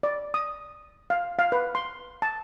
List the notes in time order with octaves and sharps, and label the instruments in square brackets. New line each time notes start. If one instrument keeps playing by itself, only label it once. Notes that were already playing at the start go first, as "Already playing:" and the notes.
[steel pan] D5
D#6
F5
F5
B4
C6
A5